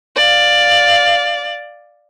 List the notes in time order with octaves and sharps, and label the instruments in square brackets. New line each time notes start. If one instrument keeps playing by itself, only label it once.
[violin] D5 F5